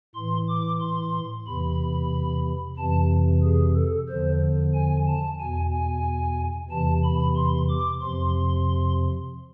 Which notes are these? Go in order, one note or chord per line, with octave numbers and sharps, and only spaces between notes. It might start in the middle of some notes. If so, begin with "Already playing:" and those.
A2 E3 C6
D6
C6
E2 C3 E3 B5
F2 C3 E3 A5
G#4
A4
E2 D3 F3 C5
G#5
A5
E2 B2 G#5
G#5
E2 C3 E3 A5
B5
C6
D6
F2 C3 F3 C6